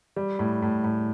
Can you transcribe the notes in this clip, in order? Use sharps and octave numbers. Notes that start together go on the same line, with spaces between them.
G3
A2
A2
A2